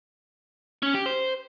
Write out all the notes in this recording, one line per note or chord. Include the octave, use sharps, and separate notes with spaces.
C#4
G4
C5